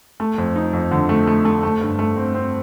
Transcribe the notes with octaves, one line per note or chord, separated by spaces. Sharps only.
A3
F2
D#4
F2
D3
A3
A3
A3
A3
G2
A3
C4
C4